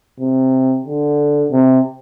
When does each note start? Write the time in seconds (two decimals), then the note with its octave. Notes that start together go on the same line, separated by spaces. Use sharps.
0.20 C3
0.86 D3
1.52 C3